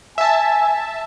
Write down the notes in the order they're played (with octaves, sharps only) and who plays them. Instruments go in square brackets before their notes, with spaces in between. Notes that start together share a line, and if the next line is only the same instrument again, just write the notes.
[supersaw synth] E5 A5 [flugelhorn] G#5